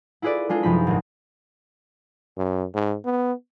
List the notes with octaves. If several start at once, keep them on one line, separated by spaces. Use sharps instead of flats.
E4 F4 G#4 B4 D5
G#3 D4 F4 G#4
F#2 C3 F3 D#4 B5
G#1 C3
F#2
G#2
B3